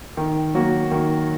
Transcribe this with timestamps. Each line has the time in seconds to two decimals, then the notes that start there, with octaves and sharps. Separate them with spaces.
0.17 D#3
0.54 F#3 A#3 F#4
0.91 D#3